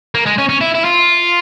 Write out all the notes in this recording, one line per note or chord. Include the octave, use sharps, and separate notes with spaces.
A#3
G#3
C#4
C#4
E4
E4
F4